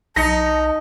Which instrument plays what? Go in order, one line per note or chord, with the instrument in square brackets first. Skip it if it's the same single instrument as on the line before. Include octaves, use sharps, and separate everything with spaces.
[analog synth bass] B1 [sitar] D#4 [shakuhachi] A5 [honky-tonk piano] A#6 C#7